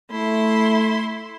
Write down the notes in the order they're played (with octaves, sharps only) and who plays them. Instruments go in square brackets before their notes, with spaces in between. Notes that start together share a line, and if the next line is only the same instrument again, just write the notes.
[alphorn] A3 [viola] E4 C6